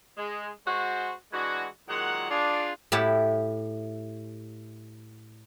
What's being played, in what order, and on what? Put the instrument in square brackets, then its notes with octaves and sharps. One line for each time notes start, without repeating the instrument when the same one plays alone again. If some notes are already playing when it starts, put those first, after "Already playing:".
[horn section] G#3
G#3 F#4 C5
E3 G#3 D4 F#4
A#2 D#3 F#3 G#3 F#5
D4 F4 G#4
[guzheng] A2 E4 G4 F#5 A5